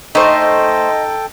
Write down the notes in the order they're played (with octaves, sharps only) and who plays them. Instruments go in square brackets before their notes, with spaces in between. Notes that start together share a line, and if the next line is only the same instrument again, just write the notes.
[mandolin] A3 C5 [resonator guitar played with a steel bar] D#4 [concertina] A4 G5 [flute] D#5